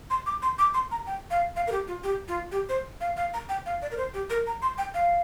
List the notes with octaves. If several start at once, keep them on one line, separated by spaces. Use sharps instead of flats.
C6
D6
C6
D6
C6
A#5
G5
F5
F5
A#4
G4
F4
G4
F4
G4
C5
F5
F5
A#5
G5
F5
D5
A#4
C5
G4
A#4
A#5
C6
G5
F5